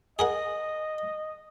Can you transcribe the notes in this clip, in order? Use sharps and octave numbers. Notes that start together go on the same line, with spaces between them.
G#4 A#4 D#5 F#5